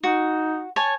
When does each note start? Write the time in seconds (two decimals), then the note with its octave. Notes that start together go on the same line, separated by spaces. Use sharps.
0.04 D#4 F#4
0.76 C#5 G#5 A5